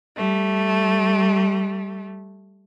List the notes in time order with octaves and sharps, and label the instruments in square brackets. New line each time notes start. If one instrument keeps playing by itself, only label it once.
[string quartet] G3 A3